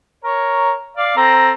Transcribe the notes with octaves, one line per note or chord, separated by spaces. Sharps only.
A#4 C#5
D5 F5
C4 A4 A#5